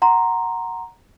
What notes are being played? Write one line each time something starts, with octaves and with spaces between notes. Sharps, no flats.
F#5 A#5 C6